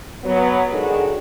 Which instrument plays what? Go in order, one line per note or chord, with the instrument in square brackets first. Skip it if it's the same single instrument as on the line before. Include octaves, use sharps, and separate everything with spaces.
[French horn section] F#3 B3
G#2 D#3 D4 F#4 G#4 A4